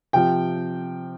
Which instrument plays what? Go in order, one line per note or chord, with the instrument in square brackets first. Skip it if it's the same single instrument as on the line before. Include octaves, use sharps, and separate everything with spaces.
[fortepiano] C3 F3 G5